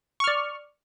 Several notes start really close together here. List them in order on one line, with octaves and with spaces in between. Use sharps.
C#6 F6 D5